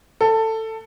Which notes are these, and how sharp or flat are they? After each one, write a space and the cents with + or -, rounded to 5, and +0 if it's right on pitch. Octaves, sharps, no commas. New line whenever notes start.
A4 +15